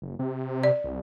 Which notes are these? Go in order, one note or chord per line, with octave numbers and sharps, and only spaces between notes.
F#1
C3
D5
C2